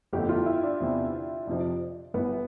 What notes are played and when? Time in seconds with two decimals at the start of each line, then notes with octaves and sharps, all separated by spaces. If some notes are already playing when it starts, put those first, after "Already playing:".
0.13 G1 F2 D3 A3 G4
0.29 F4
0.46 E4
0.63 D4
0.80 E2 C3 E3
1.47 F2 C3 F3
2.14 G1 G2 E3 B3